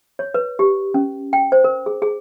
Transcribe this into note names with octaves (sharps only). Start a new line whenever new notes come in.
C#5
B4
G4
C#4
G5
C5
A#4
G#4
G#4